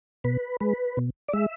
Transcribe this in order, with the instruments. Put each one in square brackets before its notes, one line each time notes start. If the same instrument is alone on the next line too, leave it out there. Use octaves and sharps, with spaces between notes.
[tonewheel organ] B2 B4
G#3 B4
B2
D5
G#3 E5